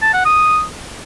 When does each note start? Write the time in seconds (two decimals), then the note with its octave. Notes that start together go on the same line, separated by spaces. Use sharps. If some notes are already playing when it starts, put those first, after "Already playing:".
0.02 A5
0.14 F#5
0.25 D#6